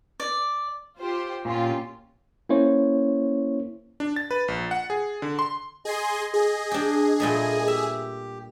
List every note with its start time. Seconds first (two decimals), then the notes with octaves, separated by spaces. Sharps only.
0.20 D5
0.98 F4 G4 C5
1.45 A#2 C#4 F4 G4
2.49 A#3 C#4 E4 C5 C#5
4.00 D4
4.16 A6
4.31 B4
4.48 A#1
4.71 F#5
4.90 G#4
5.22 D3
5.39 C6
5.85 G#4 D#5 G#5 C6
6.34 G#4
6.71 D4 G4
7.20 A#2 G3 A3 A#3 D#5 G#5
7.68 G4 E5